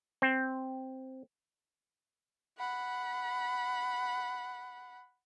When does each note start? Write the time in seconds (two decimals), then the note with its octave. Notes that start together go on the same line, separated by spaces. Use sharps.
0.22 C4
2.58 F#5 B5